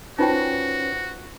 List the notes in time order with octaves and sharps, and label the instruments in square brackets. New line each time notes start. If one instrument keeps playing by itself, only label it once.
[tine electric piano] C#4 B4 C5 [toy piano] D#4 F4 G5 [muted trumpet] F#4